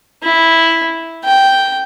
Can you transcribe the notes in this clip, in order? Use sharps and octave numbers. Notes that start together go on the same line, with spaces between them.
E4
G5